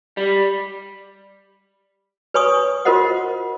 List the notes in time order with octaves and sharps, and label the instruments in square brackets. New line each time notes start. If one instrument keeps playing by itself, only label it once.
[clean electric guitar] G3
[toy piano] B4 C#5 G#5 C#6 D#6
F4 F#4 A#4 C5 D#5 F#5